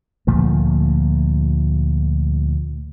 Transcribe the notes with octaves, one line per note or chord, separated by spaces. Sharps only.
D2 A#2 F3 A3